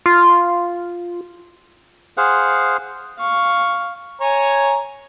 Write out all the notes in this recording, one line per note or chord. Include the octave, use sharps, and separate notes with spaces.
F4
G#4 C5 F5 F#5
F5 C#6
C#5 G#5 A#5